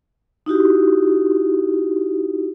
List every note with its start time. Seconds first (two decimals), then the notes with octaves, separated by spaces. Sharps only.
0.46 D#4 E4 F#4 G4